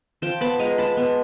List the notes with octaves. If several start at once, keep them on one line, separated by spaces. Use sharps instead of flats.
F3 G5 A5
B3 A5 B5
G#3 G#5 A#5
G#3 A5 B5
B3